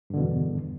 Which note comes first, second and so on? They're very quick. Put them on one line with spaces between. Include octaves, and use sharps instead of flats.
G2 D3 B2 E2